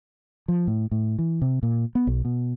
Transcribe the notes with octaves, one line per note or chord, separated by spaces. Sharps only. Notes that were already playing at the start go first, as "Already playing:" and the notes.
F3
A2
A2
E3
C3
A#2
B3
B1
B2